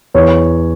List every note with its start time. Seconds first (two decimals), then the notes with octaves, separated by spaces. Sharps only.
0.14 E2 C#5